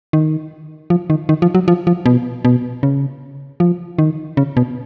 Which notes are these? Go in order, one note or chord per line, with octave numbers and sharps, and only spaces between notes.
D#3
F3
D#3
D#3
F3
F#3
F3
F3
B2
B2
C#3
F3
D#3
C#3
B2